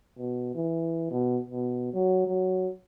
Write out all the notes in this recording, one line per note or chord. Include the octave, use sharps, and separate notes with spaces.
B2
E3
B2
B2
F#3
F#3